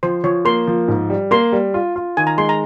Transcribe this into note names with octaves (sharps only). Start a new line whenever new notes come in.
F3 C5
F3 C#5
A#3 C6
F3
G#2
G3
A#3 C6
G3
F4
F4
D#3 G#5
A#5
G#3 C6
A#5